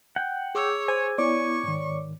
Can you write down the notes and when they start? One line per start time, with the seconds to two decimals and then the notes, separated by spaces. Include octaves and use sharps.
0.16 F#5 G5
0.55 G#4 C#5 D6 E6
0.88 C5 G#5
1.18 B3 E4 C#5 D5 C#6 D6
1.63 G#2 D#3